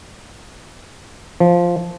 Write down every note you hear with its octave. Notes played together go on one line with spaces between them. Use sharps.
F3